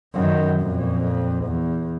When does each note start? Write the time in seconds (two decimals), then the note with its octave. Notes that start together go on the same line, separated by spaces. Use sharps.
0.14 F#2 D#3
0.61 F2 A#2
1.45 E2